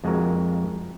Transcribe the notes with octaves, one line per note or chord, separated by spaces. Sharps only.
F2 G#3 F#4 A#4